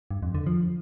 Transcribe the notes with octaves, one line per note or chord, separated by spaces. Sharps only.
G2
F2
D3
F3